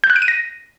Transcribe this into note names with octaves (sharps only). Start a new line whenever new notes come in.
G6
F#6
D7
D#7
A#6